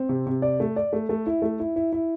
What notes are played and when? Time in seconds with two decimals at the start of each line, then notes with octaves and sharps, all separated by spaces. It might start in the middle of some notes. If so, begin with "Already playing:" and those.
Already playing: C4
0.09 C3
0.27 C3
0.42 D5
0.60 A3
0.76 D5
0.93 A3
1.09 A3
1.26 E4
1.42 A3
1.60 E4
1.76 E4
1.93 E4